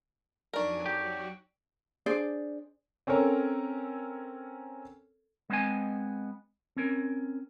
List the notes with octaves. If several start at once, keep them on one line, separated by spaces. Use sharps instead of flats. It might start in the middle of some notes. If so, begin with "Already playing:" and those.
F2 F#3 D4 D#4 A#4 D5 G#5 C#6
F#3 F#4 G4
D4 G#4 C5 D5
C4 C#4 A4 A#4 C#5
G#3 B3 C4 D#5 G#5
C4 C#4 A#4